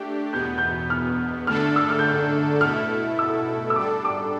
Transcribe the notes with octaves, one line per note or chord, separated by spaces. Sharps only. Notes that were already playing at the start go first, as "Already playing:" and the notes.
Already playing: A3 D4 G4
E2 B2 B3 G6
G6
F6
D3 A3 D4 A4 F6
E6
F6
G6
F6
B2 A3 E4 A4 F6
E6
E6
G3 D4 A4 D6
D6